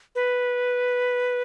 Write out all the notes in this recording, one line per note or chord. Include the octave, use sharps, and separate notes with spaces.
B4